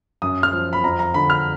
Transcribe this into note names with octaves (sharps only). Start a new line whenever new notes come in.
F#2 D#6
F6
F3
B5
F2 A#5
A#5
D3 B5
F6